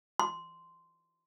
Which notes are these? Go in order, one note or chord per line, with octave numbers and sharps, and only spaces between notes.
C6